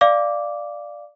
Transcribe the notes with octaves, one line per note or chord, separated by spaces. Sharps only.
D5 F5 D6